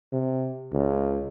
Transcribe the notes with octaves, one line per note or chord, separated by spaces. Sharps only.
C3
C#2